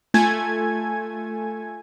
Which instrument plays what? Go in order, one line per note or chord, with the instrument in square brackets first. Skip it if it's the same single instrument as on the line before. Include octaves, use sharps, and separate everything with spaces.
[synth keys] A3 F4 A4 G#5 G#6